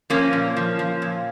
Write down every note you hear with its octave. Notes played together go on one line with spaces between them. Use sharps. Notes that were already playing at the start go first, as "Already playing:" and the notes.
F3 A#3 C#4
A#2
F3
F3
A#2